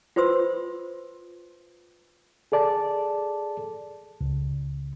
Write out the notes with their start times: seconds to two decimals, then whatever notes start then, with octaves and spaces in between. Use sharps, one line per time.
0.16 F4 B4 C5 C6 E6
2.52 G#4 A4 D5 A5
4.21 C#2